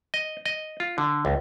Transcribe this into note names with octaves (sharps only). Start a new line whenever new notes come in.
D#5
D#5
F4
D3
C#2